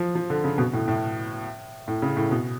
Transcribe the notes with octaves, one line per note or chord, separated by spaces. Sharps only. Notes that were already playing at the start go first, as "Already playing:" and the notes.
Already playing: F3
F3
D3
C#3
B2
A2
A2
A2
C#3
A2
B2